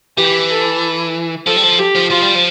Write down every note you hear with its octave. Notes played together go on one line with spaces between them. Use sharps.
E3 G4
A4
F3 A4
G3
F3
G4
F3
F3 F4
G3
F3